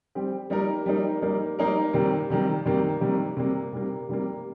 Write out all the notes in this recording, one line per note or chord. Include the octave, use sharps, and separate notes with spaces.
G3 C4 G4
G3 A#3 D#4 A#4
G3 A#3 D#4 A#4
G3 A#3 D#4 A#4
G3 A#3 D#4 A#4
C3 D#3 G3 A#3
C3 D#3 G3 A#3
C3 D#3 G3 A#3
C3 D#3 G3 A#3
C3 G3 A#3
C3 G3 A#3
C3 G3 A#3